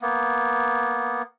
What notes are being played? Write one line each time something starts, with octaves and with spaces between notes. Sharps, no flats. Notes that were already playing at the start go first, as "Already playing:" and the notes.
A#3 B3